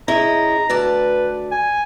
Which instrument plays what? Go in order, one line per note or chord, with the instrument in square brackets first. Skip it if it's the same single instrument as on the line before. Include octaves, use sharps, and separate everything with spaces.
[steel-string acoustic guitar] C#3 E4 D#5 [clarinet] A#5
[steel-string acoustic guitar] D2 D5 A5 [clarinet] B4
[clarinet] G#5